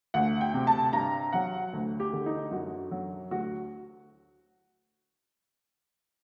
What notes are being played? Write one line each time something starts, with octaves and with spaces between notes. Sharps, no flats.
D2 F#5
G5
C3
A5
G2 A#5
F#3 F#5
D2
G4
D3
D#4
F#2 F#4
F#3
D2 F#4